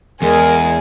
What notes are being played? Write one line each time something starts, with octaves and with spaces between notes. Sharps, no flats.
E2 G#3 G#4 A#4